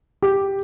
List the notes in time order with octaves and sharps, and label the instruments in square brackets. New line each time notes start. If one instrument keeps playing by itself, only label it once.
[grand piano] G4